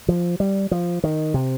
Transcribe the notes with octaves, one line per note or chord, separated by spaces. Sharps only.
F3
G3
F3
D#3
C3